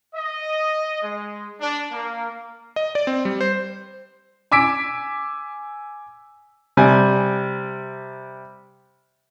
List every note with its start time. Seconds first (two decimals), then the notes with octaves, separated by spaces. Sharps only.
0.15 D#5
1.02 G#3
1.60 D4
1.92 A#3
2.76 D#5
2.95 D5
3.07 C4
3.25 G3
3.41 C5
4.52 G#5 D6 E6 B6 D7
6.77 C3 G3 G#5